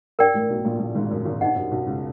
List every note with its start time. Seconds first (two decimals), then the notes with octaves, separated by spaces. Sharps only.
0.19 G2 A#4 D5 G5
0.34 A1 A2
0.50 B1 B2
0.64 A#1 A#2
0.79 A#1 A#2
0.95 G#1 G#2
1.11 F#2
1.25 G#1 G#2
1.41 G2 D#4 G4 C5 D#5 F#5
1.56 F#2
1.71 B1 B2
1.86 C#2 C#3